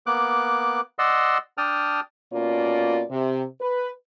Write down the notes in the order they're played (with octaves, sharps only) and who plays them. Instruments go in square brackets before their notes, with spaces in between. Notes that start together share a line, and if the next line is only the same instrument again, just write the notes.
[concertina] A#3 B3 D6 F#6
D5 D#5 F#5 C6 E6
D4 G5 A5 D#6 F6
[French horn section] B2 A#3 C#4 F4 D5
C3
B4